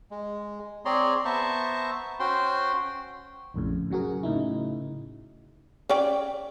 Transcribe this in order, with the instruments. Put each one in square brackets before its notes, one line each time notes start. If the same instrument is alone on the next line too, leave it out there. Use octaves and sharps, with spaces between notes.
[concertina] G#3
C4 G#4 C#5 D5 A#5 C6
B3 C5 E5 A5 A#5 C#6
C#4 F#4 C5 G5 C6
[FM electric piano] A#1 F2 A2 C#3
C#3 F#3 F#4 G#4 A#4
A2 C#3 D#4 E4
[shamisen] C#4 D5 G5